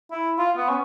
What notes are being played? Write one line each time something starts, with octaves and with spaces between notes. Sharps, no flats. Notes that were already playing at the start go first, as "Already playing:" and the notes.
E4
F4
B3
C#4